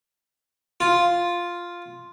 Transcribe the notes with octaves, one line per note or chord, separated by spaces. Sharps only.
F4